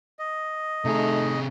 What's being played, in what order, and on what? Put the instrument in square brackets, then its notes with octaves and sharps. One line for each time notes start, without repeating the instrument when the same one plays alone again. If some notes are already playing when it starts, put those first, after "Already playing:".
[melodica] D#5
[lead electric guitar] C3 G#4 [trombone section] A3 D#4